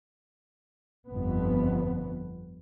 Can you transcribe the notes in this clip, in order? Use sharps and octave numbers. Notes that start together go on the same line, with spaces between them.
G1 F2 B3